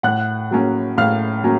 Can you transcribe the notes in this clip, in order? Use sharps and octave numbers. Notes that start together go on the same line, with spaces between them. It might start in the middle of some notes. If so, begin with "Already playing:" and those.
A2 F#5 F#6
F#3 A#3 C#4
A2 F5 F6
F#3 A#3 C#4